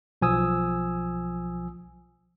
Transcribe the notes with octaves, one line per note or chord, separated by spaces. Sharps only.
B1 F3 G#5 D#6 E6